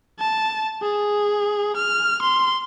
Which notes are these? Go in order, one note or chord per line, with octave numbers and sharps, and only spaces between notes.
A5
G#4
F6
C6